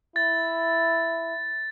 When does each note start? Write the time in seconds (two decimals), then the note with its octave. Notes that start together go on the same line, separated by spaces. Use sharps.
0.16 E4 A6